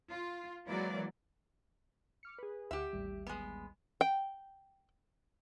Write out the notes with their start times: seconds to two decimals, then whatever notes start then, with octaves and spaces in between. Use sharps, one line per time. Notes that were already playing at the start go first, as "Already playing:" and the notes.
0.12 F4
0.67 E3 F#3 G#3 A#3 D5
2.23 D6 F6 C#7
2.38 G#4 B4
2.71 D2 G4 E5 F#5
2.93 A1 D#2 G3
3.27 G#3 B3
4.01 G5